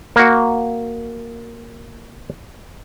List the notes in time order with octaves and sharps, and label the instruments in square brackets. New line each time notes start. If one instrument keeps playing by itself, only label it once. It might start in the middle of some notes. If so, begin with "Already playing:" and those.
[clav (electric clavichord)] A#3 F#4